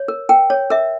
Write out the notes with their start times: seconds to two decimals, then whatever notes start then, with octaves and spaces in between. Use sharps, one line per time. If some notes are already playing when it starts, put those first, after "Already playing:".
Already playing: C#5
0.08 A#4
0.29 A#4 G5
0.50 C#5
0.70 A#4 E5